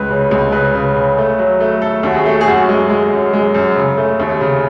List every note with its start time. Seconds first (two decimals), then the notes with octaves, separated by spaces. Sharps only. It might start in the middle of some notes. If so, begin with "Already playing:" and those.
Already playing: C#2 B4
0.10 C#3
0.31 C#2
0.52 C#3 B4
0.75 C#3
0.96 C#3
1.18 A3
1.39 F#3
1.60 A3
1.82 A3 A4
2.03 D#2 F#4
2.15 G#4
2.26 A3
2.41 G#4
2.47 F#2 F#4
2.69 G#3
2.90 G#3
3.12 F#2
3.33 G#3
3.54 F#2
3.76 C#3
3.97 A3
4.20 D#2
4.41 C#3